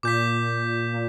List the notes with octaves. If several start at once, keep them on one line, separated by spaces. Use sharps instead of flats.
A#2 D6 G6 B6
A#2